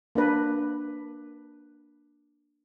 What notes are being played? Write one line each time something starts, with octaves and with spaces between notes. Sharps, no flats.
A#3 D4 B4